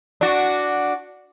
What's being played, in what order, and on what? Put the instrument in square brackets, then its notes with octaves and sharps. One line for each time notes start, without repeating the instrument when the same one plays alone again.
[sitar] D4 F#4